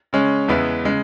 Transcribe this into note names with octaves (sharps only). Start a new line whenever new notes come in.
C#3 G#3 C#4
E2 C#3 G#3 B3 E4
C#3 G#3